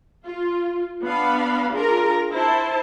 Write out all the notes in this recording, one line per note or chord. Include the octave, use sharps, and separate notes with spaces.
F4
B3 D4 F5 B5
D4 F4 G#4 A#4 A#5
E4 C5 A5